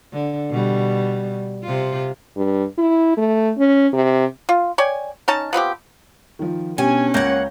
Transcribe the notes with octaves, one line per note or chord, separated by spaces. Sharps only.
D3
B2 G3
C3 F4
G2
E4
A3
C#4
C3
F4
C#5 D5 G5 G#5
C#4 D#4 A5
F3 B3 C4 G4
D#3 F3
B2 C#4 D4 G4 G#5
C#2 A#3 C#5 F#5 G6 A#6